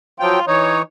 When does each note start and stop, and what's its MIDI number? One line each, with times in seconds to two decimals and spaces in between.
0.20 0.39 53
0.20 0.39 54
0.20 0.46 65
0.20 0.39 79
0.47 0.82 52
0.47 0.80 63
0.47 0.82 73